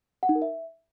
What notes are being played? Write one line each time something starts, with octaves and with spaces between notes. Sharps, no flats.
F#5
D#4
A#4
E5